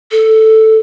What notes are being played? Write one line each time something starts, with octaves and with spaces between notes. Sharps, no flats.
A4